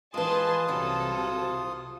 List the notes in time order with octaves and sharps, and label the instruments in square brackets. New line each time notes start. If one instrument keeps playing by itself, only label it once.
[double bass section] E3 [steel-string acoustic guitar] G#3 B4 [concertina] F4 D#6 [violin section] G#4 A5 C6
[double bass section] C2 C3 [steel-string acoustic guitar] F#3 [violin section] A4